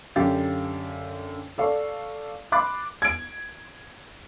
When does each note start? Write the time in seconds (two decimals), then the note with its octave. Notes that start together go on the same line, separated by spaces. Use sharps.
0.16 F#2 D3 G4 F5 A6
1.58 A4 D5 F5 C#6
2.52 B5 C6 D6 F#6 A6
3.02 G#6 D7